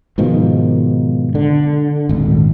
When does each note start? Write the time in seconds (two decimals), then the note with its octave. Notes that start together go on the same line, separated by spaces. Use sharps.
0.18 G#2 B2 D#3 F3
1.35 D3
2.09 D#1 G#1